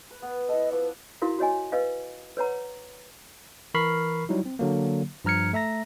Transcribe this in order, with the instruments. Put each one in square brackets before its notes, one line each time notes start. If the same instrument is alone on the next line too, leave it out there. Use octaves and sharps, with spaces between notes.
[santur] B4
B3
[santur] E4 A4 [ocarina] D#5
[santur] F3 D6 [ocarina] B4
[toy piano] E4 F#4 A#4 F5
F#4 C#5 D#5 G#5
B4 D#5 F5
B4 C#5 F#5 A#5
[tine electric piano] E3 A#4 B5 C#6 F6 C7
F#3 G3 D#4 E4
C4
D3 F#3 A#3
G2 F3 A#5 F6 G#6 C#7
A3 E5 A#5 A#6